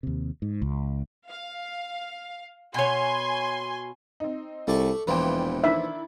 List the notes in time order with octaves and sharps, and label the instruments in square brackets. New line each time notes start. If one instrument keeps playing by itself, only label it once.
[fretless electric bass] D#2 C3
G#2
C#2
[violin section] F5
[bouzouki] B2 C#5 [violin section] G#5 C6
[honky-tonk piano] C4 D#4
[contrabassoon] C2 [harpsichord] A3 D5 C#6
[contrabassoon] E1 [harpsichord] A#2 E3 F3 [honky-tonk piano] B4 G5
[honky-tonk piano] D#3 D4 E4 [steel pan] E5